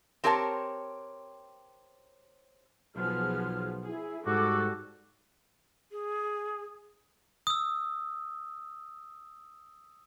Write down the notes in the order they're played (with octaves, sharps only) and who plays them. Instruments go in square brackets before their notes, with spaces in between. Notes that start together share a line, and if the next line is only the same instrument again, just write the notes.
[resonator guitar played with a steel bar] C4 G4 A#4 C#5 G#5 A5
[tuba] B1 [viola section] F3 B3 G#4 [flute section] F6
[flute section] E4 [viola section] G#4
[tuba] G#2 [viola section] G3 A4 [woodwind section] F#4 [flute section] D6
[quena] G#4
[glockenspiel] D#6 E6